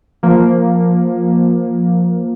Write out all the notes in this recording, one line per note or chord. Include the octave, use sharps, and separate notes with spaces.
F3 A#3